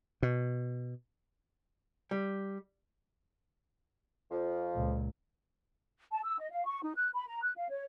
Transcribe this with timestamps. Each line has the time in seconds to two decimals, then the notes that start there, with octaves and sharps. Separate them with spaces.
0.23 B2
2.11 G3
4.30 F2 F3
4.74 C#2 A#2
6.11 A5
6.23 E6
6.39 D#5
6.51 F5
6.64 C#6
6.82 D#4
6.95 F#6
7.14 B5
7.27 A#5
7.42 F#6
7.57 F5
7.70 C#5